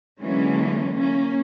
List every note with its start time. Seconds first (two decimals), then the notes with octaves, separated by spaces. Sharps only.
0.20 D3 E3 F#3 G#3 A#3 C#4
0.97 A#3 C#4